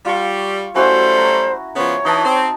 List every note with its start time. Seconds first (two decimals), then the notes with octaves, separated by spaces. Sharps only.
0.06 G3 F4 C#6
0.75 F#3 G3 A3 C#4 E4 F#4 C5
1.18 A#5
1.75 C#3 F3 B3 C#5
2.05 E3 D#4 D#5 A5
2.23 C4